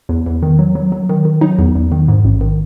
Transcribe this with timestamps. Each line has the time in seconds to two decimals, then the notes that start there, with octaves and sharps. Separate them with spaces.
0.09 E2
0.26 E2
0.43 D#3
0.59 F#3
0.75 F#3
0.92 F#3
1.09 D#3
1.25 D#3
1.41 F#3 D#4
1.59 E2
1.75 E2
1.92 D#3
2.08 G#2
2.25 A1
2.41 D#3